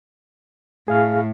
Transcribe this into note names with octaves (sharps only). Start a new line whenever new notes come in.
A2 G#4 F5 F6